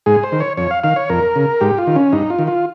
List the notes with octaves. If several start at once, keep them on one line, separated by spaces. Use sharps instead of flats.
G#2 G#4
C5
D#3
C#5
F2 C#5
F5
D#3 F5
C#5
F2 A#4
C#3
G#2 G4
F4
D#3
C#4
G2 D#4
F4
D#3
F4